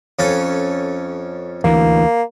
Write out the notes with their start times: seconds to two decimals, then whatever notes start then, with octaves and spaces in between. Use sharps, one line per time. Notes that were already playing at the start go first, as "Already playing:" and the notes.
0.19 F2 C#4 A4
1.64 D2 E3 A#3